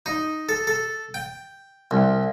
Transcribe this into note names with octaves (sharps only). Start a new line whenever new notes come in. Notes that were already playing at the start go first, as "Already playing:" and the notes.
D#4
A4
A4
G5
C2